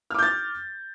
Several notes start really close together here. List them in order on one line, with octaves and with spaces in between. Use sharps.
F6 D6 G6 A6